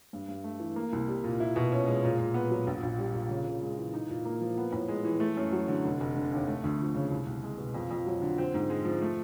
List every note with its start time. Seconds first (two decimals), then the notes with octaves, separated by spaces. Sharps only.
0.13 G2
0.28 G2
0.44 A3
0.60 E3
0.76 A#3
0.93 C2
1.08 G3
1.24 A#2
1.40 E4
1.56 B2
1.72 C#4
1.87 G#3
2.04 A#2
2.18 A#2
2.34 B3
2.50 F#3
2.67 A#1
2.83 A#1
2.99 G3
3.14 A#2
3.30 C#3
3.47 C#3
3.62 G#3
3.77 E3
3.94 D#4
4.09 A#2
4.25 A#3
4.41 F3
4.58 B3
4.72 A2
4.88 G#3
5.05 E3
5.20 A3
5.37 F#2
5.52 F#3
5.68 D3
5.84 F1
6.00 F1
6.16 D3
6.32 D#2
6.48 A3
6.64 D2
6.80 F3
6.95 C#3
7.11 C2
7.26 C2
7.43 G#3
7.58 B2
7.74 F2
7.91 F2
8.06 F#3
8.22 D3
8.38 C4
8.54 G#2
8.70 G#3
8.85 F3
9.02 A3